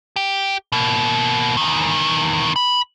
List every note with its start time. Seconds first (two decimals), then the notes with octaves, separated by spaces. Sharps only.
0.16 G4
0.72 B2 A#3
1.57 E2 D#3
2.56 B5